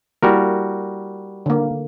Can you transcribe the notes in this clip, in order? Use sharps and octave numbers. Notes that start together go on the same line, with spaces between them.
G3 A#3 E4 F#4 A#4
D3 A#3